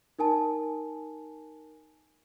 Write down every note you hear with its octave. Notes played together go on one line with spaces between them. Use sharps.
D#4 A#4 G#5 A5